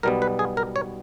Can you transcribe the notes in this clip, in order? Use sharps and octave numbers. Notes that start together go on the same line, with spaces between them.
B1 B2 G3 B3 A#4
B4
G#4
A#4
C#5